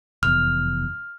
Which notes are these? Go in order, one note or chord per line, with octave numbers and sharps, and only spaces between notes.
F1 E2 F6